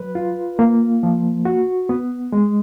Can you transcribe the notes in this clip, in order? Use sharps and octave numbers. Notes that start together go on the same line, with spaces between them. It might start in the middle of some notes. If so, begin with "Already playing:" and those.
Already playing: F#3 B4
F4
A#3
F3
F#4
B3
G#3